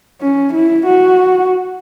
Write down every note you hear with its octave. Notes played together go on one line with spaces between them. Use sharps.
C#4
E4
F#4